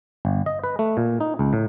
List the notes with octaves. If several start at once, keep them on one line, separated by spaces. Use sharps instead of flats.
G1
D#5
B4
A3
A#2
D#4
C#2
A2